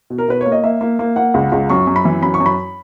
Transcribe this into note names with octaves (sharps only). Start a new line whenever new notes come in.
B2
A#4
B2 B4
A#3 C#5
D#5
A#3 E5
A#3
A#3
A#3 F#5
C#2
C#2
F#2 C#6
F#2
B5
E3
F#2 B5
C#6
F#2
B5